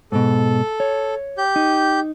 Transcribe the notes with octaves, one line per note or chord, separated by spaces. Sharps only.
G#2 B2 A4
C#5
G4 G6
D#4